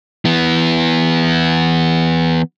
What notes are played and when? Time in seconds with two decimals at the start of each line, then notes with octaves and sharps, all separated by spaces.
0.25 E3 B3